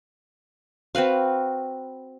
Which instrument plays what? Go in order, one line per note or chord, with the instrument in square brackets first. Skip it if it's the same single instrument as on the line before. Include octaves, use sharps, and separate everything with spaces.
[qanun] C4 F#4 B4 F5